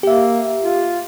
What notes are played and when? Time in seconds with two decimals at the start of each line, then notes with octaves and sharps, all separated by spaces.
0.03 A#3 G4 E5
0.62 F4